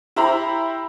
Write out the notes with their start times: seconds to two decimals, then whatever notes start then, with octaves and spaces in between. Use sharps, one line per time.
0.16 E4 G4 C5 E5 A#5 B5